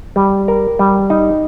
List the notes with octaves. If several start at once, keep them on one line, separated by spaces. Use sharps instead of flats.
G3
A#4
G3
D#4